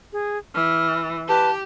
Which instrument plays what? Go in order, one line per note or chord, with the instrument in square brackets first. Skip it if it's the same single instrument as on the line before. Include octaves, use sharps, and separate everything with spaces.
[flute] G#4
[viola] E3 [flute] F6
[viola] G4 [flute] B4 [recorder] A5